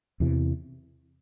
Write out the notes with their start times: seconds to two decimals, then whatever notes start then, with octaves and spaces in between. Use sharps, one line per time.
0.20 E2 C3 E3